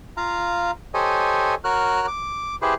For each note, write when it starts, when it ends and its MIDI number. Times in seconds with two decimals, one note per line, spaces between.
0.17 0.71 65
0.17 0.71 77
0.17 0.71 82
0.94 1.55 67
0.94 1.55 69
0.94 1.55 72
0.94 1.55 73
0.94 1.55 75
0.94 1.55 80
1.64 2.06 66
1.64 2.06 70
1.64 2.06 73
1.64 2.06 89
1.64 2.06 90
2.08 2.56 86
2.62 2.74 64
2.62 2.74 67
2.62 2.74 68
2.62 2.74 71
2.62 2.74 72